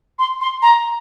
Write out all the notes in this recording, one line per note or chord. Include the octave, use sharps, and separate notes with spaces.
C6
C6
A#5